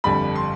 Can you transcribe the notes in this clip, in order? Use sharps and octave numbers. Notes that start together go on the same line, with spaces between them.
G1 F2 D3 G3 B5
C6